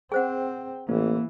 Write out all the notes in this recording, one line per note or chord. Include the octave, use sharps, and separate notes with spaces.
C4 G#4 C5 F#5 G5
A1 E3 A#3